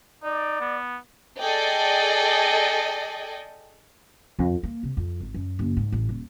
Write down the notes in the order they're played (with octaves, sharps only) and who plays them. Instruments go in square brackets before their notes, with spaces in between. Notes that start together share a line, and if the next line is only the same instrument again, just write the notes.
[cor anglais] D#4 [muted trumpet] D5
[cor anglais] B3
[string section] G#4 A4 D5 D#5 G5
[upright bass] F2
A#3
C3
F2
G#1
F#2
F#1
G#2
A1
D#1